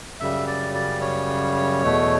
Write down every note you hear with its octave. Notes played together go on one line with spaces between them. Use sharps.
F#2 C#3 G3 E5
D5
D5
C#5
E2 B2 A3